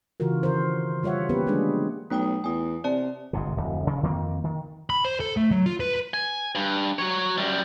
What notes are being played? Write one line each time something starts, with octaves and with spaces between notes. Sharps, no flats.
C#3 E3 F4 F#4 A#4
D#3 A#4 C5
G3 F4 C#5 E5 F#5
A#3 B3 C#4 G4 B4
F3 G3 G#3 D4 G#4
B1 A3 G5 D#6
E2 G#5 D#6
C3 D5 A5
G1 G#2 C3
D1 F2
C#3
F2 D#3 A#3 C4
D#3
B5
C5
A4
A3
F#3
F4
B4
G#5
G2
F#3 C#5
F#2 G3